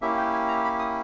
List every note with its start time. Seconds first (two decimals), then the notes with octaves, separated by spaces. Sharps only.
0.02 A#3 C#4 E4 G4 E5
0.18 G5
0.33 G#5
0.48 A#5
0.64 B5
0.79 D#6